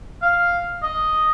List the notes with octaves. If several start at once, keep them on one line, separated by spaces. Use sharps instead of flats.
F5
D#5